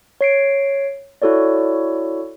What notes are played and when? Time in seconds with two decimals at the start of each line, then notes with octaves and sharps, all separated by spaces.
0.21 C#5 C7 D7
1.22 E4 F#4 A4 C#5 D5